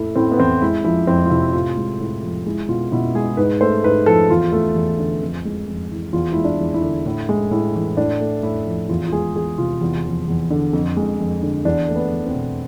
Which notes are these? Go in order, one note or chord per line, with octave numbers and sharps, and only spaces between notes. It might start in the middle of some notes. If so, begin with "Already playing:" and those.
Already playing: A2 A3 E4
A2 C4
B3
E3 C4
G#3 E4
F3 E4
F2 C4
F4
C3 E4
A2 F4
G#3
A2
F3
G#3 E4
B2 F4
B2 E4
G#3 G#4
G#2 B4
A3 C5
G#2 B4
F3 A4
E2 F4
A3
E2
D3
F2
G#3
F2
E3
E2 F4
G#3 E4
D4
E2
E4
D3
A2
G#3
A2
E3
A2 D4
A3
A2 E4
F3
E2 F4
F4
G#3 G#4
E2 G#4
C3 F4
E2
F3
E2
D3
F2
G#3
F2
D3
E2 D4
A3
B3
E2
C4
B2